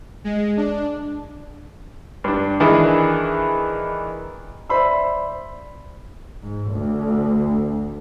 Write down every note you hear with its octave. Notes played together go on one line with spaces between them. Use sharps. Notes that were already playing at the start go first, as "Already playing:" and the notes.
G#3
D4
G2 D4
D#3 E3 D4 E4 G#4
C5 D5 E5 B5 C6 E6
G#2
D2